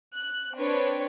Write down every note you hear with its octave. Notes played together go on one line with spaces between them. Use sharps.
F#6
C4 D4 B4 C#5